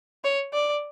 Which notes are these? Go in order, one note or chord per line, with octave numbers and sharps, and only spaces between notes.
C#5
D5